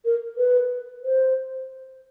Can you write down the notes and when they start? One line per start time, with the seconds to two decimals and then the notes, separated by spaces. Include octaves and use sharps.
0.05 A#4
0.38 B4
1.04 C5